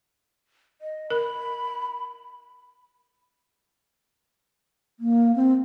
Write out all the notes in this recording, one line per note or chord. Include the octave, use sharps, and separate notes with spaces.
D#5
A#4 B5
A#3
C4